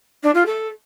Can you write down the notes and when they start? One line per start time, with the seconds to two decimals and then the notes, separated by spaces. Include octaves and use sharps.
0.23 D4
0.34 F4
0.46 A4